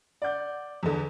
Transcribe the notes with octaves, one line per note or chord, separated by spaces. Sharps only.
D5 F#5 G6
E2 D3